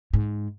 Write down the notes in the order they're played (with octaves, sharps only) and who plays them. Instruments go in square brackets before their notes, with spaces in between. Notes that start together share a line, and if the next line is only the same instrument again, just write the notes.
[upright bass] G#2